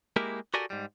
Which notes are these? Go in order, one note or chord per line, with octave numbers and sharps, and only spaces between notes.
G#3 A#3 E4 G4 A#4
F#4 G4 A4 A#4 D5 G#5
G#2 G3